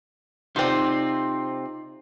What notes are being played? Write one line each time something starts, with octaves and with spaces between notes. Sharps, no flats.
C3 C4 D#4 F4 D5